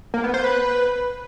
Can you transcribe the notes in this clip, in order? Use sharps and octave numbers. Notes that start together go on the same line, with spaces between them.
A#3
B3
C5
B4